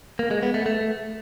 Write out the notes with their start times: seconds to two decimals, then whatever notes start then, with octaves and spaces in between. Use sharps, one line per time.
0.19 A#3
0.31 G#3
0.43 B3
0.54 A3
0.66 A3